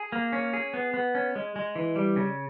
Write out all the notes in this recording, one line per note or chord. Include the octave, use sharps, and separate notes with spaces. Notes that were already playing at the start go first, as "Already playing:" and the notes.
Already playing: G#4
A#3
C#4
G#4
B3
B3
C#4
G#3
G#3
E3
G3
C#3